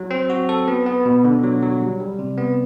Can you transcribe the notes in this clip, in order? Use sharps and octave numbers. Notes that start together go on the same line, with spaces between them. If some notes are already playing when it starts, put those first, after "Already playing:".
Already playing: F#3
C4
F#4
A4
B3
B3
B2
D3
F#3
F#3
G3
G3
C3
B3